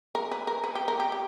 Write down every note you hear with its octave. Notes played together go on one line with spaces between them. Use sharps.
A#4
B4
A#4
B4
G4
A#4
G4
G4